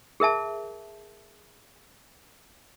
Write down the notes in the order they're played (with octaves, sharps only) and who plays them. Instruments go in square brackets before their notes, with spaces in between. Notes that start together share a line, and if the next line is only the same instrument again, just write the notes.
[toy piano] G#4 A#4 E5 A5